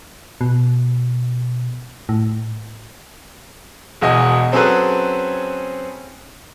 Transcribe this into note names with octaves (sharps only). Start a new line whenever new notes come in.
B2
A2
E1 E2 F#4 D#5 G#5
F#3 C4 C#4 G#4 A4 B4